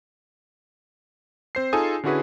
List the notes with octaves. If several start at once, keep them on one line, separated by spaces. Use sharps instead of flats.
C4 C5 C7
D#4 F4 G#4 A4 G#5 D#6
D3 C#4 E4 F#4 G#4 B4